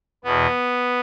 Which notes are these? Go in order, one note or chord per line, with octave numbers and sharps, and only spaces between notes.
E2 B2 B3